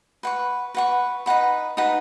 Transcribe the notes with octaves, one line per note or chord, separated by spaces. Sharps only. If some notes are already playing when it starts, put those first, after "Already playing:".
B4 F#5 C#6
B4 F#5 C#6
D#4 B4 F#5 B5
D#4 B4 F#5 B5